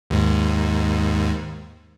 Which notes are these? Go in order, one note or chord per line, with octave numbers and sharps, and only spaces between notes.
D#2 G#2